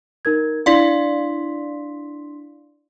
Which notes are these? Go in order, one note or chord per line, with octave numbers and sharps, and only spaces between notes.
D#4 A#4 G#6
D4 E4 D5 F5 C6 B6